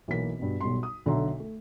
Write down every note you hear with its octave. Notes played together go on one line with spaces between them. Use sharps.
B1 E3 A#3 B6
G2 B2
B1 B2 G3 C6
D#6
B1 D3 D4 E5 A#5 C6
A3